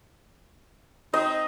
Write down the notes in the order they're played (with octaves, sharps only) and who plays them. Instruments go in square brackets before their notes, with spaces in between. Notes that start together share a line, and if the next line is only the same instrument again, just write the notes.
[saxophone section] C4 D#4 [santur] D#5